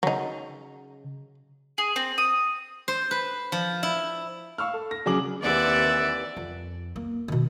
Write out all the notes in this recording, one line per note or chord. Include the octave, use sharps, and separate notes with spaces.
C#3 F#3 D#4
G#4
C4
D#6
C5
B4
F3
E4
F5 C#6 E6 F6
A4
A#6
C#3 F#3 C#4 G#4 D6 F#7
D#2 C3 E3 D5 E5 F#5
F2
A#3
B2 D#3